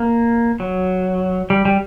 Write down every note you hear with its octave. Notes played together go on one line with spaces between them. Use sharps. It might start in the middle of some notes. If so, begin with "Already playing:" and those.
Already playing: A#3
F#3
G3
G3